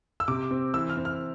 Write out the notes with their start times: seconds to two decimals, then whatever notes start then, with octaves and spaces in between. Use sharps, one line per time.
0.20 E6
0.28 C3 D6
0.51 C4
0.74 E3 E6
0.89 F6
0.97 C4
1.05 F6